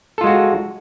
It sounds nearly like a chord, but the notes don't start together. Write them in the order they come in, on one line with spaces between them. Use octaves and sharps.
A4 F4 G#3 F#4